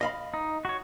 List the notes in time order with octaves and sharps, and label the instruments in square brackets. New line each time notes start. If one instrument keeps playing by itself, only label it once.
[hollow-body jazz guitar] D#5 F5 B5
[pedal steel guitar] D#4
F#4 C#5